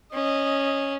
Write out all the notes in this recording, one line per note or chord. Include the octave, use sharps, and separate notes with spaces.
C#4 D#5